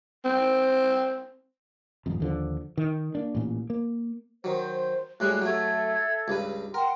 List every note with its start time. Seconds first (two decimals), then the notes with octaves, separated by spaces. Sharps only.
0.25 C4
2.06 D#1 G#1 F2
2.20 D#2 D3 F3
2.77 D#3
3.15 A#3 D4
3.35 A1 A#2
3.70 A#3
4.44 D#3 F#3 C5
5.20 A2 G3 G#3 F#4 F#6
5.42 F#3 A3 A4 E5 G#6
6.28 C#2 G2 B4
6.74 A#4 F#5 G5 C6